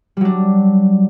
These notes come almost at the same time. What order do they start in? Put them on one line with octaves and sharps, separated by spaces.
G3 F#3 D4